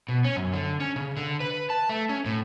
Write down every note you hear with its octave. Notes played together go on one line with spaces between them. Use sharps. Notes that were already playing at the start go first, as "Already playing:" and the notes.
B2
C#4
F#2
D3
C#4
C#3
D3
B4
A5
A3
C#4
A2